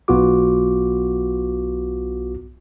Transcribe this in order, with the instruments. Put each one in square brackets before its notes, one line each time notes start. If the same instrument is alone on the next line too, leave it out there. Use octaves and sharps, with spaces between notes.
[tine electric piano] B1 B3 F4 F#4 D6